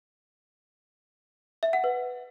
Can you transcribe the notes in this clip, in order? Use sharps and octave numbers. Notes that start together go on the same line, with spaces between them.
E5
F#5
B4